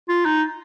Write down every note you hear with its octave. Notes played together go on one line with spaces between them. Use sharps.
F4
D#4